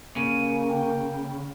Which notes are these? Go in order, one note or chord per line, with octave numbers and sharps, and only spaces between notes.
C#3 A#3 D#7
G5